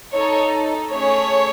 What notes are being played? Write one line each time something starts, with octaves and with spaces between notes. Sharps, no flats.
D#4 A4 C#5
A3 C#4 G#4 C#5